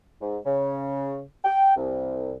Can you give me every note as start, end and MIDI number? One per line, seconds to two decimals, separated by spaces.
0.21 0.38 44
0.46 1.20 49
1.45 1.74 79
1.76 2.34 36